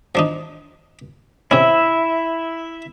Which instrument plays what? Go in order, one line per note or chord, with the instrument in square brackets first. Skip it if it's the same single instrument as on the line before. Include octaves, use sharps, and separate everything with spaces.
[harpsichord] F3 D4 D#4
[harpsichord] C3 C#4 [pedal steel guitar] E4 E5